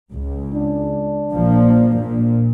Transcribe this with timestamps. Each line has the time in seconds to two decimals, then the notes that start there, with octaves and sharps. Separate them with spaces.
0.13 C#2
0.54 D4
1.34 A#1 F3 A#3
1.98 A#2